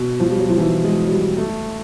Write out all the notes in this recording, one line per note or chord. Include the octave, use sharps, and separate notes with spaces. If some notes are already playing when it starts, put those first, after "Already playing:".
Already playing: B2
F3
G3
F#3
F3
E3
G#3
F#3
G3
A3